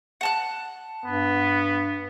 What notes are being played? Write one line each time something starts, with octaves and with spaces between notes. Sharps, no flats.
F#5 A5 F#6
G2 B3